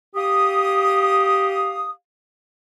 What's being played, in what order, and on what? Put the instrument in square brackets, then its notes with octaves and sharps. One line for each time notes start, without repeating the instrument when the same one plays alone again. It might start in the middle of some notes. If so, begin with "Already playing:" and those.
[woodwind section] G4 F5 D#6